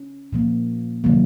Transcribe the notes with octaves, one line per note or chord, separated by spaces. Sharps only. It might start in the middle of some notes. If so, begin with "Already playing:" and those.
Already playing: C#4
A#2 F3 A#3
C3 D#3 F#3 A#3